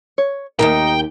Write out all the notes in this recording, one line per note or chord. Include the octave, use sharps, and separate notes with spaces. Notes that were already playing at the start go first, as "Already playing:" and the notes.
C#5
D#2 G#2 D#4 G4 A#4 G5